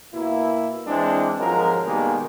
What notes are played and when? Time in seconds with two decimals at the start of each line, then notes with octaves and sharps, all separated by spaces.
0.14 B2 A#3 E4
0.87 E3 G#3 C4 D4
1.39 G#1 F2 F3 F#3 G#3 A#4
1.87 B2 D#3 G3 G#3 A#3